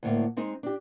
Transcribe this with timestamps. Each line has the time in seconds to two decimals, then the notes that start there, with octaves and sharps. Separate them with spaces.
0.03 D2 A2 A#3
0.37 G#3 C4 D#4
0.63 D4 G4